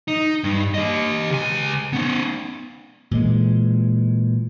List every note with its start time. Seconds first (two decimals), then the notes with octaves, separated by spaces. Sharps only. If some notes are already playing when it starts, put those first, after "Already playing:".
0.08 D#4
0.44 G2
0.74 G4 D#5
1.30 C#2 G#5
1.93 B3 C#4
3.11 A#2 E3 G#3